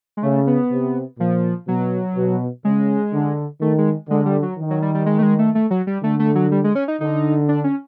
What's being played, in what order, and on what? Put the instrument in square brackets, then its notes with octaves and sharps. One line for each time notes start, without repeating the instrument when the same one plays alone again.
[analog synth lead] G#3
[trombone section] C#3 [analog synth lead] A3
[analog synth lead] B3
[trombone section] C3
[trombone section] A#2 [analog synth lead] F3
[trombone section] B2 [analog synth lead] F#3
[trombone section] B2
[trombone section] C#3 [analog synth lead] G#3
[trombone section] D3
[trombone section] D#3 [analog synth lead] A3
[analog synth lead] G#3
[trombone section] D3 [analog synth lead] G#3
[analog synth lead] G3
F#3
[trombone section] D#3
[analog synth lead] F#3
G3
G3
G#3
A3
G#3
A3
A3
F#3
G3
[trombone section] D3 [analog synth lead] A3
[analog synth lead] A3
F#3
G3
G#3
C#4
D#4
[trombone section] D3 [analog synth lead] D#4
[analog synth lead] D4
C#4